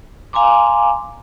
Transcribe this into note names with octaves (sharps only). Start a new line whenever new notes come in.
F5 G#5 A#5 C6 D6